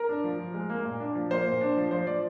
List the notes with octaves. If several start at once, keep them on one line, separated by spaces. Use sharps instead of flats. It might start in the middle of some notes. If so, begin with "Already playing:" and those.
Already playing: A#4
D4
F3
F3
G#3
A#3
A#2
D4
F3
A#3 C5
A#2
D4
F3
F3 C5
F3 D5